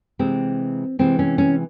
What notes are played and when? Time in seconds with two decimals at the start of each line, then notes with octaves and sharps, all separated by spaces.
0.19 C3 E3 G#3 C4
0.99 C3 E3 G#3 C4
1.19 C#4
1.38 C#4